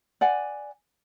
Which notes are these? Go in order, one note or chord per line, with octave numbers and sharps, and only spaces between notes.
D5 F#5 G#5